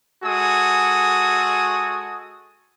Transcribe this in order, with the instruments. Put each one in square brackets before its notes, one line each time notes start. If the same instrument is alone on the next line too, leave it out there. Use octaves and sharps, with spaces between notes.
[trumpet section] G#3 F#4 A4 G#5 D#6